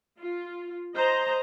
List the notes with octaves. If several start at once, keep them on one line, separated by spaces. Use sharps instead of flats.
F4
C5 D#5 A#5